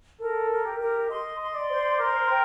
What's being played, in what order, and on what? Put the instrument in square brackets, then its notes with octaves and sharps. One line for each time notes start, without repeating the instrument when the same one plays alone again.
[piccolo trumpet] A4 [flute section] A#4
[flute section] A#4
[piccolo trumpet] G4
[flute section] A#4
[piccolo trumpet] D#5 [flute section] C6
[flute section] C6
[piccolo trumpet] D5
[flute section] C5
[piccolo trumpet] A#4 [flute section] C6
[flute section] G5